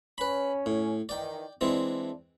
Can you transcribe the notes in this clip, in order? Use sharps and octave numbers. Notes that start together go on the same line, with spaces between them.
C#4 B4 B5
A2
D#3 E3 D5 G5
E3 G#3 C4 D4 E4